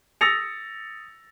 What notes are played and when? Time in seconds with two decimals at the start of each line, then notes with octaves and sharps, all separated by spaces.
0.21 D#6 E6 A6 A#6 C#7 F7